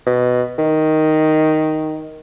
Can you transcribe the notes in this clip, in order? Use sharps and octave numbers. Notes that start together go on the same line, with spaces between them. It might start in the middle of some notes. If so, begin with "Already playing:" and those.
B2
D#3